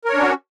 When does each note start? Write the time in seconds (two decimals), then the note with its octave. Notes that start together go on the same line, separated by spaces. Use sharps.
0.05 A#4
0.09 C#5
0.13 D4
0.17 C#4
0.22 F#4